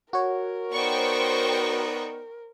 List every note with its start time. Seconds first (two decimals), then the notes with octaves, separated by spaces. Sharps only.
0.13 F#4 A#4 C#5
0.72 B3 D#4 C5 D5 G5 C#6